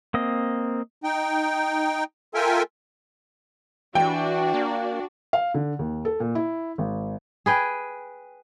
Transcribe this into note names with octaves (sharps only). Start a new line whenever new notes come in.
A#3 C4 D#5
D#4 G5
F4 A4 A#4 E5 G5 G#5
E3 D4 F#4 D5 G5
A#3
F5
D3
D#2
A4
A#2
E4
G#1
G#4 B4 G5